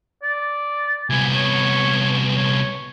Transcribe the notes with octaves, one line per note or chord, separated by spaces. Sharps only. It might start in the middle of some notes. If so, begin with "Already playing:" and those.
D5
C2 B3 G#5
C#5
C#5